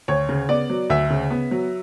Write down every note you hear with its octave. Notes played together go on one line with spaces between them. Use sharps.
D2 C#5
C#3
B3 D5
F#3
D2 E5
C#3
B3
F#3